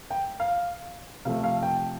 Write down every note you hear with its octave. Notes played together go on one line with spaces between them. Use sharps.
G5
F5
C3 F3 A3 F5
F5
G5